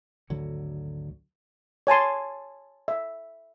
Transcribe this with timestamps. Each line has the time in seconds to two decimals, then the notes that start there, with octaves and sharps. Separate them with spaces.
0.30 G#1 D2 D3 F#3
1.87 C#5 G#5 A5 C6
2.88 E5